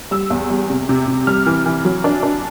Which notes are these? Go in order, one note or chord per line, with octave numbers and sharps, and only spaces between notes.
G3 E6
E2
G3
C3
C3
C3
G3 F6
E3
E3
F#3
D4
D4